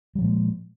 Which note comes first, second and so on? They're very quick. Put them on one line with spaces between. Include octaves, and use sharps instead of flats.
G3 F3 A#2 G#3